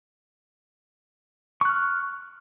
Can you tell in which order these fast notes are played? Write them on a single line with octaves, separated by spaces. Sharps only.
C#6 F#6 F6